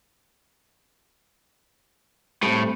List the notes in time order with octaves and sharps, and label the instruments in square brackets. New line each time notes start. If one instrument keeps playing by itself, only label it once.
[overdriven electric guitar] A2 [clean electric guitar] G3 A3 C4